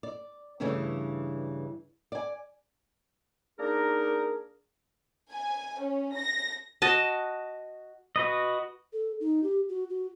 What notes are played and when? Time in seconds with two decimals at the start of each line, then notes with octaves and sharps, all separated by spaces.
0.03 D5
0.60 G2 C#3 E3 A3 C#4 D4
2.12 D5 G#5
3.59 A#3 D4 D#4 G#4 A#4
5.31 G#5
5.80 C#4
6.15 A#6
6.82 F#4 D#5 A5
8.16 F#4 B4 D#5
8.92 A4
9.20 D#4
9.43 G4
9.69 F#4
9.90 F#4